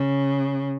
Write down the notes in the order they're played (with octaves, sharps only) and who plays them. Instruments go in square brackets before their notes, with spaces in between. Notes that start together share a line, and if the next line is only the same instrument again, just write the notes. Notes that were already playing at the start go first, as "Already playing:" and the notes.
Already playing: [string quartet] C#3